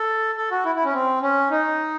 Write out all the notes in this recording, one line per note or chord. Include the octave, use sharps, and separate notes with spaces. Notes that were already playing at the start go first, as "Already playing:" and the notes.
Already playing: A4
A4
F#4
E4
E4
C#4
C4
C#4
D#4